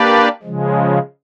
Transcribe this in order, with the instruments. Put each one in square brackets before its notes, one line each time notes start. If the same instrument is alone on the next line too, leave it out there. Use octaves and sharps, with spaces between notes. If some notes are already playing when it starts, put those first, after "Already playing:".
Already playing: [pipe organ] A#3 D4 G4 B4 D5
C#3 F3 G#3